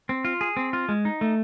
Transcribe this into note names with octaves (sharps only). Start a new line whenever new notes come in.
C4
F4
G#4
C4
F4
G#3
D#4
A3